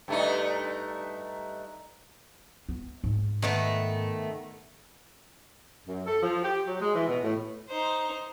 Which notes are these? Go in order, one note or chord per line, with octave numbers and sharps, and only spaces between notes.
G2 A3 D#4
B3
G#2
D#3 A3 B3
F#2
A4
F3
G4
F#3
G#3
E3
B2
A2
D#4 C5